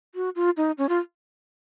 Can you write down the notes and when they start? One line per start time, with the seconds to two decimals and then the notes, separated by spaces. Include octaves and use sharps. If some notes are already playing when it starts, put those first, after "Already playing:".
0.15 F#4
0.36 F4
0.57 D#4
0.78 C#4
0.89 F4